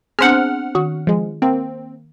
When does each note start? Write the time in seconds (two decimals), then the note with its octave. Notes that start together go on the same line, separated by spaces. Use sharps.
0.19 B3 C4 D4 G#4 C5 F#5 F6
0.75 D#3 F#4
1.07 F3 G#3
1.42 A#3 C4